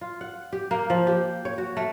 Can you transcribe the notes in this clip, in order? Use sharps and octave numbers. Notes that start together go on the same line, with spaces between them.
F4
F#5
G4
A#3
F3
G4
C#5
F#4
A3